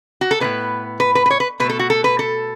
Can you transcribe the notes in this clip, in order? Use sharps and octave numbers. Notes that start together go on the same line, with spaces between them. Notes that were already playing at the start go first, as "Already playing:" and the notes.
F#4
A4
A2 E3 B3 B4
B4
B4
B4
C#5
B4
B2 A3 B4
A4
F#4
A4
B4
A4